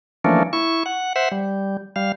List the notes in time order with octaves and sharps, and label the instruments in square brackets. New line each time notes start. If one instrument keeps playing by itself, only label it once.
[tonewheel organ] E3 F3 A3 A#3 C#4 D4
E4 C#6
F#5
C5 E5 F#5
G3
G3 F5